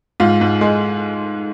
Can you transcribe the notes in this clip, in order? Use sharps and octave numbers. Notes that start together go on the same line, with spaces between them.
G#2 F4
G#2
G#3